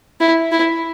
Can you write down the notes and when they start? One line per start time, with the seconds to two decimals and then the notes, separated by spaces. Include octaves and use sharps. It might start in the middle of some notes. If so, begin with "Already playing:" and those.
0.20 E4
0.52 E4